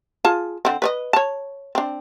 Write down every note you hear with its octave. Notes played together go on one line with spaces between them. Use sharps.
F4 G#4 A5
D3 C4
B4 C#5 D#5
C#5 A5
C4 D4